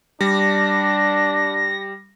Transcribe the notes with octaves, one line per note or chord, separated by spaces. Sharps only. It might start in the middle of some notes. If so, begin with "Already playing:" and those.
G3 D4 A#6